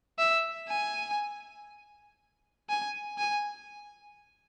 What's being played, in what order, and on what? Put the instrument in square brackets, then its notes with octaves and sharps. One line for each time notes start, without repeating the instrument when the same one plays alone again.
[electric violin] E5
G#5
G#5
G#5